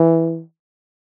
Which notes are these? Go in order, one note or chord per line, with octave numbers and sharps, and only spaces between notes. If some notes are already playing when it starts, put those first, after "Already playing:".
Already playing: E3